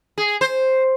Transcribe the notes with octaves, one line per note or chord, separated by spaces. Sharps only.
G#4
C5